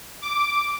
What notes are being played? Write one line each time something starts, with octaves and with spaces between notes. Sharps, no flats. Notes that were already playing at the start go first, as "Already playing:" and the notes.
D6